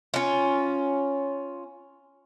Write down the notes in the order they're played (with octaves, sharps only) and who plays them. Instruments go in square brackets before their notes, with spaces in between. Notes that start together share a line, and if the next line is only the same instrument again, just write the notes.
[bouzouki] C#4 F4